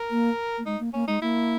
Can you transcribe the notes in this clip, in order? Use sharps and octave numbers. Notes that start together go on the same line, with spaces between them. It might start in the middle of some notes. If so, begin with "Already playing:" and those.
Already playing: A#4
A#3
A#3
G#3 D#4
A#3
A#3 C#4
G#3 D#4
A#3 E4